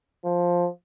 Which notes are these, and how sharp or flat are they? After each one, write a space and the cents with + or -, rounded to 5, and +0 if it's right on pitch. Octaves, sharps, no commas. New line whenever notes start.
F3 +5